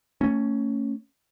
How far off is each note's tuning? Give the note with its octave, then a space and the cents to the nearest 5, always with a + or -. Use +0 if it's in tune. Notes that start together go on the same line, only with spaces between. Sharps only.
A3 +30 C#4 +0